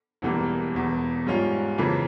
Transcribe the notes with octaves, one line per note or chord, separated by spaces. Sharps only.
E1 E2 E3 G3 A#3
E1 E2 E3
G#2 G3 C#4 F4
F2 C#3 E3 A#3